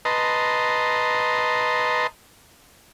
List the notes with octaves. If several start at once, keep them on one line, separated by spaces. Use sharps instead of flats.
B4 D#5 A5 A#5 C6